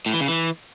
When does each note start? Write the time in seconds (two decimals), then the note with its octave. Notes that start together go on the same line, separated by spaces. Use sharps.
0.06 A2
0.13 E3
0.21 C#3
0.28 E3